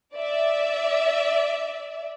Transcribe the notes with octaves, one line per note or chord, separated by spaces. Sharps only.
D5 E5